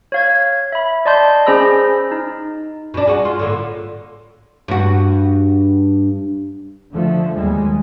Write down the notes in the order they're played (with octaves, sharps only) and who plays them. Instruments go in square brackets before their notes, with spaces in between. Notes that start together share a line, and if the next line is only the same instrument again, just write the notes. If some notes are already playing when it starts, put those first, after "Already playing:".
[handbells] C#5 F5 G#6
E5 B5
D5 D#5 A5 C6 G6
C#4 G#4 C5 B5 E6 A#6
D#4
[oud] B2 D4
G#3 F#4
F4
A2 D3 A#3
G2 F#4
[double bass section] D3 F3 A3
D#2 G3 G#3